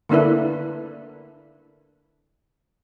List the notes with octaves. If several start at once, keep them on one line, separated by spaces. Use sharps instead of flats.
D3 A#3 D4 E4 B4